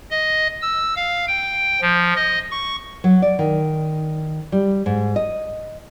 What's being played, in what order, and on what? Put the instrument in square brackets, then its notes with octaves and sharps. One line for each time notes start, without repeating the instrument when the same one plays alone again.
[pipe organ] D#5
E6
F5
G5
F3
D#5
C#6
[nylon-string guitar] F#3
D5
D#3
G3
G#2
D#5